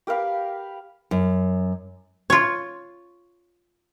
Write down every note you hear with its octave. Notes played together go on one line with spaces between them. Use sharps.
G4 A#4 B4 F5
F#2
F4 C#5